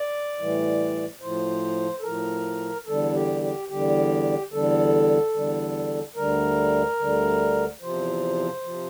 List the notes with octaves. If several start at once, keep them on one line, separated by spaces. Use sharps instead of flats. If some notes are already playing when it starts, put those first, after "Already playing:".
Already playing: D5
A2 E3 G3
A2 F3 C5
A4
A2 F3 A#4
E2 D3 G3 A4
G4
G4
E2 D3 G3 G4
E2 D3 G3 A4
E2 D3 G3
D2 D3 G3 A#4
D2 D3 G3
E2 C3 F3 C5
C3 F3